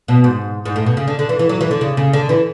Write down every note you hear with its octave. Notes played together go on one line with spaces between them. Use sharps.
B2
G#2
G#2
A2
B2
C#3
D3
D3
E3
E3
F#3
E3
D3
C#3
C#3
D3
E3